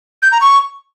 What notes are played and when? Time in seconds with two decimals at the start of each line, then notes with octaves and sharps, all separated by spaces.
0.22 G6
0.32 A#5
0.41 C#6